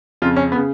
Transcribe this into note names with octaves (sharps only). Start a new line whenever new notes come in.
F2 C#3 F4
C#4
B3
C#3